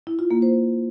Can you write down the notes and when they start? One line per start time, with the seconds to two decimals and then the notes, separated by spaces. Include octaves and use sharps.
0.07 E4
0.19 F4
0.31 A#3
0.42 C5